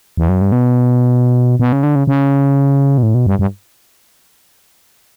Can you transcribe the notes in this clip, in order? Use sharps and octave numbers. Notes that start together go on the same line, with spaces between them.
E2
F#2
G2
B2
B2
C#3
D3
C#3
C#3
B2
A2
B2
G2
G2